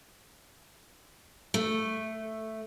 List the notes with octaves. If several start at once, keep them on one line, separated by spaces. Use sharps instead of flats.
A3